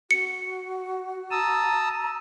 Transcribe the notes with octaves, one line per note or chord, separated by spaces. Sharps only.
F#4 C#7
A5 A#5 D#6 E6